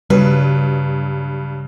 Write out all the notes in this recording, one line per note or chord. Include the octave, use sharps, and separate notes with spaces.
G2 C#3 F#3 G3 B4